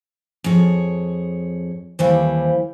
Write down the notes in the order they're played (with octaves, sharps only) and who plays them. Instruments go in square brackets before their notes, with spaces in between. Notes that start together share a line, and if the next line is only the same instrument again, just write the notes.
[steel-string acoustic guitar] F2 G#4 C#5
[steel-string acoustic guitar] D#2 E3 G3 [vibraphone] C5 F5